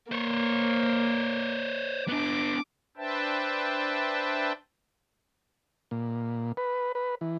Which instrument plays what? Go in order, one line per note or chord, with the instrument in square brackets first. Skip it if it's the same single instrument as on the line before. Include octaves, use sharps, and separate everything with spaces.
[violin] A#3 [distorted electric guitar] C5 C#5
[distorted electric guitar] B3 D4 [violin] D6
[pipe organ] D4 B4 C5 E5 G5 A5
[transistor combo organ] A#2
B4
B4
E3